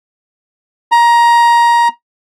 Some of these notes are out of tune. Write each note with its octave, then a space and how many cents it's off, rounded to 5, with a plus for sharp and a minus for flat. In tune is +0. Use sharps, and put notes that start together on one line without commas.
A#5 +20